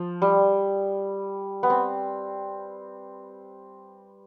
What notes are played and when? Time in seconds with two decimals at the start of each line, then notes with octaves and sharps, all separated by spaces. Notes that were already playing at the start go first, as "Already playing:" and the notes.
Already playing: F3
0.22 G3
1.63 B3
1.70 C4